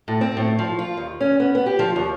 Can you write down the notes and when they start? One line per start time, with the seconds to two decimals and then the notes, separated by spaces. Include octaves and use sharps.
0.08 A2
0.21 C4
0.37 A2
0.59 F3
0.79 F4
0.97 D#2
1.21 C#4
1.40 B3
1.55 B3
1.66 G4
1.79 F3
1.96 D#2